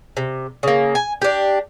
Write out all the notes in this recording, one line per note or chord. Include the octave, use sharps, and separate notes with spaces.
C3
C#3 A#3
G#5
D4 G4